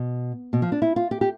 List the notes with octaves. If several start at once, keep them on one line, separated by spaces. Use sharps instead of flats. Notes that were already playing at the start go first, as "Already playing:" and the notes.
Already playing: B2
B2
F3
D4
E4
F4
G4
G4